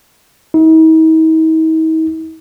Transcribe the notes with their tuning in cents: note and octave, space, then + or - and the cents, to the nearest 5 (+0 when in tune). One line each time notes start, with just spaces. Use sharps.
D#4 +45